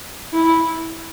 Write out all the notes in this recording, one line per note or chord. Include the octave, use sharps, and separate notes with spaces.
E4